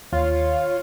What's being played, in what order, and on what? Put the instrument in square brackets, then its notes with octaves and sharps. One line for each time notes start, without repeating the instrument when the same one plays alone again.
[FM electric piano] D#2 [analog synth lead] F4 [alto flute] C#5